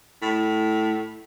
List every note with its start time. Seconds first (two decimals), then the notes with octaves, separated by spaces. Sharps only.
0.22 A2